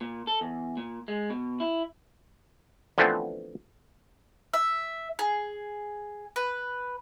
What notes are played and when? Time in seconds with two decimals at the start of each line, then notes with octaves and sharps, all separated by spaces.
0.01 A#2
0.27 A4
0.41 E2
0.77 A#2
1.08 G#3
1.30 B2
1.60 E4
2.98 D3 E3 F3 A3 B3 C4
4.54 E5
5.19 G#4
6.36 B4